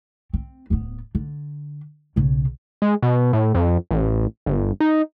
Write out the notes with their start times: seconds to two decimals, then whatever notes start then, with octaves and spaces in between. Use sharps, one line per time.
0.33 C4
0.70 D1 B3
1.15 D3
2.16 B1 C#3
2.82 G#3
3.02 B2
3.33 A2
3.54 F2
3.91 A1
4.46 G1
4.80 D#4